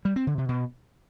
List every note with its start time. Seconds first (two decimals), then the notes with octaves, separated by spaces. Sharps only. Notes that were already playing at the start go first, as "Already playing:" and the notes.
0.05 G3
0.16 C4
0.27 D3
0.38 C3
0.49 B2